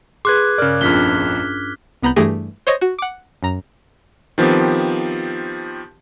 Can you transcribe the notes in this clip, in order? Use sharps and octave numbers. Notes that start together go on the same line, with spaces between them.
G#4 B4 C6 D6 F#6 G#6
G2 C#3 A#4 D5 F6
A#1 F2 C#4 D4 F4 F6 B6 G7
C2 B3 A#5 B5 G6
G2 E3 A3 G4 G#4 A#6
C5 C#5 D#5 C#6 D#6 A#6
F#4
F#5 D6
F#2 A#5
D#3 F3 B3 C4 G4